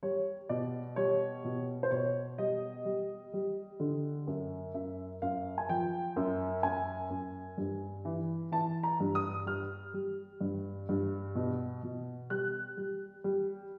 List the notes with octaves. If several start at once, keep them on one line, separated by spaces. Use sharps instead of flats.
G3 C#5
B2 D5
G3 C#5
B2
C5
B2 C#5
G3 D#5
G3
G3
D3
F#2
F#2 E5
F#2 F5
G#5
F3 G5
F#2
F#2 G#5
F#2
G2
E3
E3 A5
A#5
G2
D#6
G3 F6
G3
G2
G2
B2
B2
G3 F#6
G3
G3